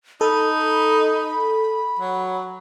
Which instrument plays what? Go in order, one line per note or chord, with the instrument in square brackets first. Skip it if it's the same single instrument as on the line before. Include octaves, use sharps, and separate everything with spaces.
[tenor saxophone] D#4 [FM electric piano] A4 [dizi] B5
[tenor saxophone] F#3